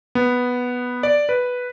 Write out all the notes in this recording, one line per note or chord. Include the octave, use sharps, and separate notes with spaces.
B3
D5
B4